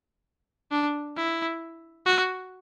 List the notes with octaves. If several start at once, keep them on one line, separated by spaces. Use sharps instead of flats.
D4
E4
F#4